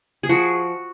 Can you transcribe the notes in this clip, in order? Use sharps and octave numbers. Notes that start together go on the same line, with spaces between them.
G#4
F3 F#4